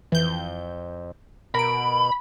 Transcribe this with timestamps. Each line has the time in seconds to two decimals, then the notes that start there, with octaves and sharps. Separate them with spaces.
0.12 F2 E3 G6
1.55 B2 A#4 B5 D7